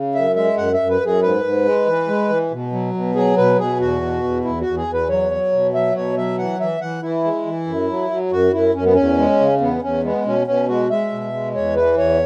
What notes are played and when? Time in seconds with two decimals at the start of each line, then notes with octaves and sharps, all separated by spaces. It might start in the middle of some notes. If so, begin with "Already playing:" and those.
Already playing: C#3
0.14 F#2 E5
0.36 G#3 E5
0.57 F#2 F#5
0.74 E5
0.79 F#2
0.89 B4
1.01 F#2 G#4
1.22 G#2 B4
1.44 G#2
1.65 G#3
1.86 E3
2.08 G#3
2.30 E3
2.51 B2
2.72 F#3
2.94 B2
3.15 F#3 G#4
3.37 B2 B4
3.59 B2 G#4
3.80 E2 F#4
4.02 B2
4.24 E2
4.44 E2 E4
4.61 F#4
4.67 E2
4.77 G#4
4.88 E2
4.93 B4
5.09 F#3 C#5
5.31 F#3
5.52 B2
5.74 F#3 E5
5.95 B2 C#5
6.17 F#3 E5
6.38 E3 F#5
6.60 E3 E5
6.81 E3 F#5
7.02 E3 E4
7.24 G#3
7.46 E3
7.67 F#2
7.89 F#3
8.10 F#3
8.32 F#2 F#4
8.53 F#2 E4
8.75 F#2 C#4
8.84 B3
8.94 E2 C#4
9.18 G#3
9.40 C#3
9.61 E2 B3
9.82 E2 C#4
10.04 G#3 B3
10.25 B2 C#4
10.47 B2 C#4
10.68 G#3 F#4
10.90 G#3 E5
11.12 B2
11.33 G#3
11.55 E2 C#5
11.76 E3 B4
11.98 E2 C#5